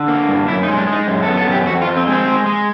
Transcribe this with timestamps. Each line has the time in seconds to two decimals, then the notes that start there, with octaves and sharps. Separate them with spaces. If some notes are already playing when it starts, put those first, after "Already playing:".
Already playing: D3
0.08 A#3
0.28 G2
0.48 F#2 E4
0.63 D#4
0.68 G#3
0.78 D4
0.87 G#3 D#4
1.08 F#2
1.23 A4
1.27 B3
1.38 A4
1.47 F#2 G4
1.67 F2 F#4
1.82 F4
1.87 F2
1.97 C4
2.07 G#3 C4
2.27 G#3
2.46 G#3